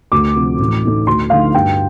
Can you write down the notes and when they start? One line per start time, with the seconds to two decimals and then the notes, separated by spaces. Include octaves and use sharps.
0.12 D2 D6
0.36 C3 F3
0.59 A1
0.84 A2 A3 D#4
1.07 D2 C6
1.30 D3 F3 A3 D#4 F5
1.54 G2 G5